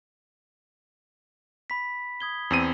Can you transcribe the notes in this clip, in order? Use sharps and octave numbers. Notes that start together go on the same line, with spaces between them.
B5 B6
D#6 G#6 G7
E2 C4 D#7